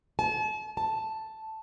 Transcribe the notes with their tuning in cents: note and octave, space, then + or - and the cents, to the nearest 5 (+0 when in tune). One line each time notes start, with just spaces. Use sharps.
A5 -40
A5 +0